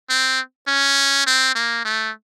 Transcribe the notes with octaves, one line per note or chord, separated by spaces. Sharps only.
C4
C#4
C4
A#3
A3